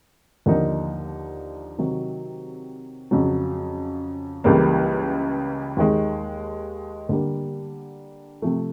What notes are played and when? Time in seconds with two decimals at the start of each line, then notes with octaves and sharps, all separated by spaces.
0.46 D#2 D3 F3 A#3 D#4
1.78 C3 D#3 F#3
3.11 F2 C#3 F#3
4.44 C#2 C#3 E3 G3 A#3
5.77 D#2 D#3 G#3
7.09 D3 G3 A#3
8.42 C3 F3 A3